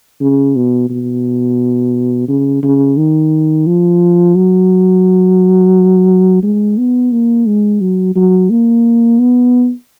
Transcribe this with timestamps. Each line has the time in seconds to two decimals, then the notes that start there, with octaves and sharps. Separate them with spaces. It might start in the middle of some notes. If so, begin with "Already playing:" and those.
0.21 C#3
0.56 B2
0.90 B2
2.28 C#3
2.63 C#3
2.97 D#3
3.67 F3
4.35 F#3
6.43 G#3
6.77 B3
7.12 A#3
7.46 G#3
7.81 F#3
8.15 F#3
8.50 A#3
9.19 B3